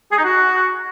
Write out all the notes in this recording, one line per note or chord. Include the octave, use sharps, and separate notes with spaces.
G#4
D#4
F#4